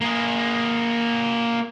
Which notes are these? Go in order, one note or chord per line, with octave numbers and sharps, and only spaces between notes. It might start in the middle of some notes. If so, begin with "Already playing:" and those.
A#3 G#4